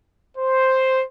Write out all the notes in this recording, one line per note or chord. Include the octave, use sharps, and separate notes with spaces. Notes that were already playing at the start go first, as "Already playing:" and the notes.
C5